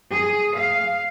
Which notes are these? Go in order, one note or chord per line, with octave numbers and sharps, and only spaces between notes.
G#4
F5